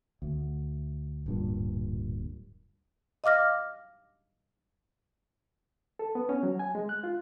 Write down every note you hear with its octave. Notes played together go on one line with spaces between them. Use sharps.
D2
D1 G2 A#2
D#5 F5 D6 F6 A#6
A4
B3
C#4
F#3
G#5
G#3
F#6
F4